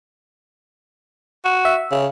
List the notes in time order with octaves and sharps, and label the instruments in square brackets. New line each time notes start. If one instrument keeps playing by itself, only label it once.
[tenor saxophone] F#4
[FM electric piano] E5
[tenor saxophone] C#3